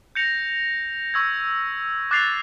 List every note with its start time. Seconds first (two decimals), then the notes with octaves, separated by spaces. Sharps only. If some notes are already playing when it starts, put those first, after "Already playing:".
0.15 G6 A#6 C#7 F7
1.14 C#6 E6 G#6
2.11 D6 F#6 A6 C7 F7